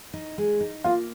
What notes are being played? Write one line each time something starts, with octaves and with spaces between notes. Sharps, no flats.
D#4
G#3
D#4
A#3 F4